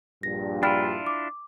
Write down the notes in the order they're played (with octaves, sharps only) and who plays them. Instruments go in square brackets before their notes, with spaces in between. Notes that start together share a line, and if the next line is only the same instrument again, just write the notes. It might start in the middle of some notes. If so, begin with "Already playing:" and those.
[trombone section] A#1 G2 A#2 [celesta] A#6
[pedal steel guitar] D4 E4 F4 [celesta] G5 B5 F6
[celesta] D6